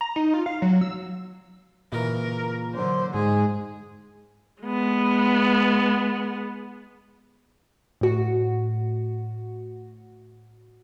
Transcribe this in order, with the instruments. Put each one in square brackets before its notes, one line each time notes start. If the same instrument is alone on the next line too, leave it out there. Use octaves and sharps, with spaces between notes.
[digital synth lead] A#5
D#4
F4
F5
F#3
E6
[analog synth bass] A#2 [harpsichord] C#3 E3 [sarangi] A#4
[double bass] D3 F#3 [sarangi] C5
[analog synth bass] G#2 [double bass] G#3 [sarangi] G#4
[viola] G#3 B3
[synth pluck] A2 F#4